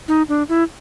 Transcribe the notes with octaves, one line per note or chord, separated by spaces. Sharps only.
D#4
D4
E4